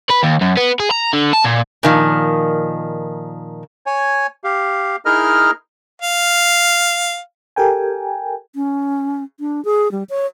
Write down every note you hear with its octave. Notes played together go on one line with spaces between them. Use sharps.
B4
D#2
F#2
B3
G#4
A#5
D3
A5
A#2
A#2 D#3 F3
C#5 G#5
G4 F5
D#4 E4 G#4 A#4 D#5 F6
F5
G4 A4 A#4 G5 G#5
C#4
D4
G#4
G3
C#5